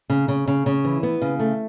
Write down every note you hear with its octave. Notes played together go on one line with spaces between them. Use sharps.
C#3
C#3
C#3
C#3
E3
B3
C#3
A3